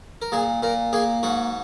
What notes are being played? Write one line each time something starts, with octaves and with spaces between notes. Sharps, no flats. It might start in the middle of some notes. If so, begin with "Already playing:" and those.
A#4
A#2 G#4
A#2 A#4
A#3 G#4
G#2 F#4